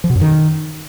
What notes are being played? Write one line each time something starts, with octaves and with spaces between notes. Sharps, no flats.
F3
B2
F#2
D#3